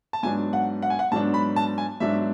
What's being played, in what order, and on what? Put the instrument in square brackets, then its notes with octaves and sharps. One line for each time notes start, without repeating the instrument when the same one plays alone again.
[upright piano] A5
G#2 F#3 B3 D4 G#5
F#5
F#5
G#5
F#5
G#2 F#3 B3 D4 A5
B5
A5
G#5
G#2 F#3 B3 D4 E5